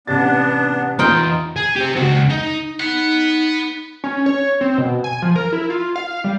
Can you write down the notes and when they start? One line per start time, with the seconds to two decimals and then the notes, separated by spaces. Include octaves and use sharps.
0.07 A1 C3 B3 D4 A6
0.99 E2 D#4 F4 G5
1.56 G#4
1.76 G4 C5
1.96 C#2 F#4
2.30 D#4
2.80 D#4 B4 F#5
4.04 C#4
4.26 C#5
4.61 C4
4.78 B2
5.04 G#5
5.22 F3
5.36 A#4
5.53 E4
5.70 F4
5.96 F5
6.24 G3